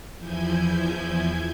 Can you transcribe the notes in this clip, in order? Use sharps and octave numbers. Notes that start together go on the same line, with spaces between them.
E2 F3 E4 G#5 G6 G#6